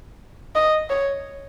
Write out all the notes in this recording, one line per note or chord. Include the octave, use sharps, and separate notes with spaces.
D#5
C#5